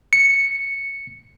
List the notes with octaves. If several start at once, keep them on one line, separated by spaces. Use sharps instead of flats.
C#7